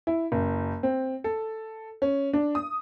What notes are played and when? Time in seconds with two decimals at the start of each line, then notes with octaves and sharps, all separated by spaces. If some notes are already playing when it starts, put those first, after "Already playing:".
0.07 E4
0.32 F#1
0.83 C4
1.24 A4
2.02 C#4
2.33 D4
2.55 D#6